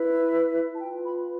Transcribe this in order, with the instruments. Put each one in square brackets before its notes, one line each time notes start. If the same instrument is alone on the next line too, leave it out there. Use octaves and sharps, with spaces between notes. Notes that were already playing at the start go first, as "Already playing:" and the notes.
Already playing: [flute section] E4 B4
A5
F4 B4 G5
B5